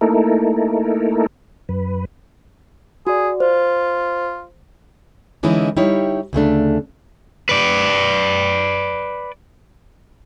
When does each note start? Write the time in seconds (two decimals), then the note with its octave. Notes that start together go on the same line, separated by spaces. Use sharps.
0.01 A3 A#3 D#4 E4 A4 A#4
1.69 F#2 B4
3.07 F#4 G#4 D5
3.40 F4 C5
5.43 D3 E3 G#3 C#4 D#4 E4
5.77 G3 D#4 E4 G4 C#5
6.33 D2 C#3 A3 D4
7.49 B4 D5